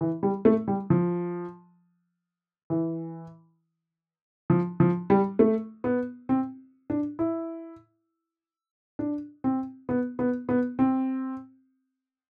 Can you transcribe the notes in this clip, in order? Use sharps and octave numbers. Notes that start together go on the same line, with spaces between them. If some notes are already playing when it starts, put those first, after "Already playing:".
E3
G3
A3
G3
F3
E3
F3
F3
G3
A3
B3
C4
D4
E4
D4
C4
B3
B3
B3
C4